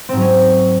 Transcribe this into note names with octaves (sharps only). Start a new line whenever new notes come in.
G#2 F#3 C4 C#4